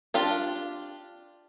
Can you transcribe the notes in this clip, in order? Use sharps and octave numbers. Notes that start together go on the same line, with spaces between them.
D4 F4 G4